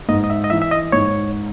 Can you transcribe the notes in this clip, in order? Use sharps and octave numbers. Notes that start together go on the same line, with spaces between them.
G#2 D#5
D#5
E5
D#5
E3 E5
E5
D#5
G#2 C#5